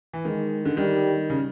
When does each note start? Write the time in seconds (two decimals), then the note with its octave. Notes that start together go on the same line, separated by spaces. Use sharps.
0.13 E3
0.25 D#3 G#3
0.65 D3
0.77 D#3 G3
1.30 C#3